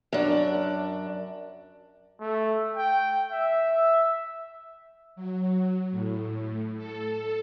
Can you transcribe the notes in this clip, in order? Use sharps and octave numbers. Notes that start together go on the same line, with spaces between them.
F#2 D4
A3
G5
E5
F#3
A2
A4